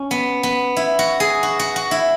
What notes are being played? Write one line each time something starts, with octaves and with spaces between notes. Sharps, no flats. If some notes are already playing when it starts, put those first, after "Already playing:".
Already playing: C#4
B3
B3
E4
F#4
G#4
F#4
F#4
F#4
E4